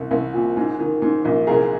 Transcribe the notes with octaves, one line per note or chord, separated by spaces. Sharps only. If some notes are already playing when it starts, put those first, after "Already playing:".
Already playing: C2
C2
A#2
G#2
D#3
G#2
A#1
C2 G#4 A#4